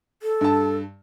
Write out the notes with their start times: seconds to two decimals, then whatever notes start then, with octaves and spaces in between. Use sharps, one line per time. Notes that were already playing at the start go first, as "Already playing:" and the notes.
0.23 A4
0.41 G2 A5